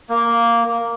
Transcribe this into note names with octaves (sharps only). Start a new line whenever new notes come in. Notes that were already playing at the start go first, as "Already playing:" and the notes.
A#3